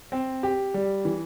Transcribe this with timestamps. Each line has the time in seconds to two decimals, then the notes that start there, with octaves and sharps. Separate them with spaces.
0.12 C4
0.43 G4
0.74 G3
1.05 E3